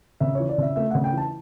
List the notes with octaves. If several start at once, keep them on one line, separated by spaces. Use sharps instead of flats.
C#3 E5
C#5
E3
D5
C#3 E5
A3 E5
C#3 F#5
G5
E3 A5